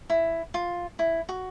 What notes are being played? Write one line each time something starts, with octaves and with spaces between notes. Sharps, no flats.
E4
F4
E4
F#4